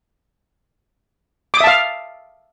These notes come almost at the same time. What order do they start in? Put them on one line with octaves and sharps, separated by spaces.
D6 D#6 E5 A5 F5